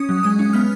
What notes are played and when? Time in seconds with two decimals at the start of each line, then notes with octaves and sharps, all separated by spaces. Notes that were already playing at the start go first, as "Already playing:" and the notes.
Already playing: C#4 D#6
0.09 F#3
0.23 G#3 D#6
0.39 C#4
0.53 B3 F6